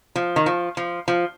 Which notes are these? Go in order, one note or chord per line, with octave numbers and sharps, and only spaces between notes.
F3
D#3
F3
F3
F3